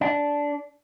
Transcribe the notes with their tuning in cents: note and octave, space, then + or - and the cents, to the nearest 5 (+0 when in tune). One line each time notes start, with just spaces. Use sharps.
D4 -10